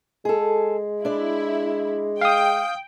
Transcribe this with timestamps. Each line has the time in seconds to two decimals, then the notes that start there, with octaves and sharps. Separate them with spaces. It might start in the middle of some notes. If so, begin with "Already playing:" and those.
0.25 G#3 G#4 A4
1.05 D4 E4 D5
2.21 F5 G5 D#6